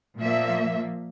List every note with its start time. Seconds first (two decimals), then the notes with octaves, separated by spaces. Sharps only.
0.18 A#2 F3 A#3 E5